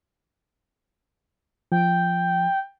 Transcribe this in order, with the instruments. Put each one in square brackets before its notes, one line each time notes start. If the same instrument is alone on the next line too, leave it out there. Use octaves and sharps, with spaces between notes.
[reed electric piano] F3 [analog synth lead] G5